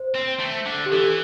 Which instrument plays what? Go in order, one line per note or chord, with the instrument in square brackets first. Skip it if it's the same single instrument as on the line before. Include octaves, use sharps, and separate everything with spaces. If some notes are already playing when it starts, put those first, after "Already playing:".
Already playing: [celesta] C5
[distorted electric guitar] C4
A3
D3
[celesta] G4
[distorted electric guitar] E3 [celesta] A4